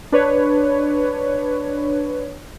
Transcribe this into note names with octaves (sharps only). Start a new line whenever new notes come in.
D4 B4 C#5